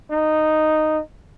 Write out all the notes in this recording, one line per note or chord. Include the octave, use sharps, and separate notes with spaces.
D#4